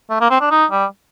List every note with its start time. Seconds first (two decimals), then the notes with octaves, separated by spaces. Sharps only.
0.10 A3
0.21 A#3
0.31 C4
0.41 D4
0.51 D#4
0.71 G3